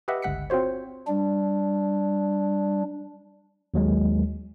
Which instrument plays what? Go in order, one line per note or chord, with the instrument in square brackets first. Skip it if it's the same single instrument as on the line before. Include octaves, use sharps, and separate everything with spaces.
[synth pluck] G4 B4 D#5 E5 F#5
G1 C#2 F#5 B6 C#7
C4 F4 F#4 C5 C#5
[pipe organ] G3 D4
[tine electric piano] D#2 F#3 G#3